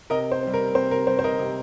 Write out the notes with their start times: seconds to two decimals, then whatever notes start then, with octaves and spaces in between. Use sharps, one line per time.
0.10 C3 A#4 D#5
0.32 C5
0.43 G3 C4
0.54 A#4
0.75 C3 C5
0.91 A#4
1.07 G3 C4 C5
1.19 C5
1.24 A#4 D#5
1.39 C3